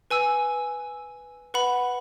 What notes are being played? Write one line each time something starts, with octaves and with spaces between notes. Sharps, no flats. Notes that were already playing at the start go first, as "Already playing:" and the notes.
B4 G#5 E6
B4 F#5 B5